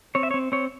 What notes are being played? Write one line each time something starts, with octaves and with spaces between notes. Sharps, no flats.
C4 C#5
E5
C#5
C4
C4 C#5